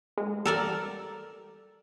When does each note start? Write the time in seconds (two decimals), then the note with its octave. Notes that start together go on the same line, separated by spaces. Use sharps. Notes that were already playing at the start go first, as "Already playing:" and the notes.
0.18 G#3
0.45 G3 A4 A#4 D5